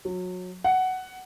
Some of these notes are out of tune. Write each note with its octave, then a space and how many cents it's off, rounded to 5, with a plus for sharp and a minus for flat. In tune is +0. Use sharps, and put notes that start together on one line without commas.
F#3 -25
F#5 +10